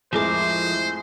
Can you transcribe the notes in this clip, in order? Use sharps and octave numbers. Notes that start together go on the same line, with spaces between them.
F2 A2 F3 G#3 A#4 C5 D6